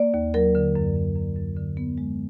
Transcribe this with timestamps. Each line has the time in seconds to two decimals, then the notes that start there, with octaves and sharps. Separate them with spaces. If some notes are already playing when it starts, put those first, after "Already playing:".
Already playing: A#3 D5
0.14 D#2
0.34 F#3 A#4
0.55 D3
0.75 F#2
0.96 F#2
1.16 F#2
1.37 F#2
1.56 D3
1.77 B3
1.98 G#3